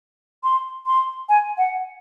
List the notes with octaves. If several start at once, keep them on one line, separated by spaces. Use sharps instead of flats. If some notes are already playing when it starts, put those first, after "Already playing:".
C6
C6
G#5
F#5